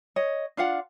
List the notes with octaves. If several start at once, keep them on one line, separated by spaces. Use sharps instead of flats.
C#5 D#5
D4 F4 F5 F#5